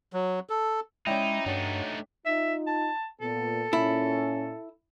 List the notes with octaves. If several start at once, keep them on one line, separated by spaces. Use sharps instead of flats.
F#3
A4
G#3 C#4 D#4 E4 D5 G5
G2 F#3 A3 D4 D#4
D#4 F4 E5
A5
A#2 B3 A4
A#2 C#4 E4